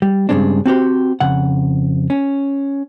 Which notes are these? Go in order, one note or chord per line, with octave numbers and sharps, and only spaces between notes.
G3
G2 C#3 G#3 C4 D4
C4 F#4 G4 C5
F2 C#3 F#5
C#4